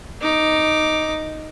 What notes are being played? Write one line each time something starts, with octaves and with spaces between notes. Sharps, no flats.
D#4 D6